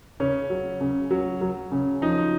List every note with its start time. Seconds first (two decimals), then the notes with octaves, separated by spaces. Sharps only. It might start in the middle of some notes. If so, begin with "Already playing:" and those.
0.20 C#3 C#4
0.50 F#3
0.81 C#3
1.11 F#3
1.41 F#3
1.72 C#3
2.02 F3 D#4